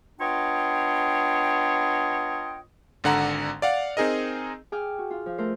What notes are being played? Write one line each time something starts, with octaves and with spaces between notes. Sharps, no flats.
B3 D4 F4 C#5 D#5 G5
G#1 D3 F#5 A#5
D5 F5 F#5
C4 D#4 G#4 A#4 D#5
G#4 G5 D6 F6
F#4
F4
F3
A3 A#4 C5